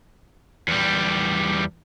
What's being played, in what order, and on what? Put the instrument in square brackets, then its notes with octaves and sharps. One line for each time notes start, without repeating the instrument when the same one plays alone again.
[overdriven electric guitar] E2 G3